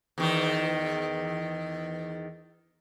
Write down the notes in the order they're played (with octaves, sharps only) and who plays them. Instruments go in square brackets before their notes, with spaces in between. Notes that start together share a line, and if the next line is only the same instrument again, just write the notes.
[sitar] E2 D#3